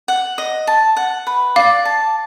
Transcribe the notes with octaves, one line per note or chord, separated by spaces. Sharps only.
F#5
D#5
A5
F#5
B4
D5 F5
A5